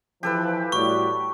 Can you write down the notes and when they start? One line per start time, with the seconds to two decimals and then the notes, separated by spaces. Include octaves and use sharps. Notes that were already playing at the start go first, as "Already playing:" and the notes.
0.23 E3 F3 G4 A4 B4
0.72 A2 G3 F#4 C#6